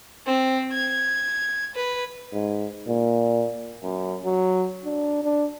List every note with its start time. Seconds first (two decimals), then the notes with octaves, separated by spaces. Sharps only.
0.26 C4
0.71 G#6
1.75 B4
2.33 G#2
2.88 A#2
3.83 F#2
4.25 F#3
4.85 D4
5.23 D4